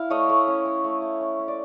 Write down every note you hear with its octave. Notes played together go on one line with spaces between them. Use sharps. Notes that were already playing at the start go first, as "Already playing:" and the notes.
Already playing: E4 F5
A3 C#5 D#5
A3
C#4
C#4
A3
A3
C#4
C#4
D5